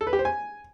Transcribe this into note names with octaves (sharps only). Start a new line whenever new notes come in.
A4
B4
G4
C5
G#5